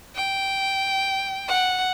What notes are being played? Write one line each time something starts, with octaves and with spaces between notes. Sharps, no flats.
G5
F#5